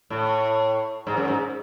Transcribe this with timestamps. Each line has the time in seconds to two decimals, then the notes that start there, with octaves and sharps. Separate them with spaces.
0.10 A2
1.07 G#2
1.17 F#2
1.28 G#2